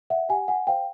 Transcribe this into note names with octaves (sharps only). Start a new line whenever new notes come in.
E5 F#5
G4 F#5 G#5
F#5 G#5
C5 F5 G5